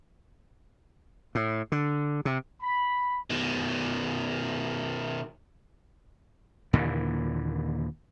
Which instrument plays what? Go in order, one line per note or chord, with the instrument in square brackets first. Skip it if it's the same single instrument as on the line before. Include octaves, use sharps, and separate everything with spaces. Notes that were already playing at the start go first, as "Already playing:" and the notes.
[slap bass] A2
D3
C3
[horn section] B5
[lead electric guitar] B2 D#3
[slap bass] D#2 A#2 D3 E3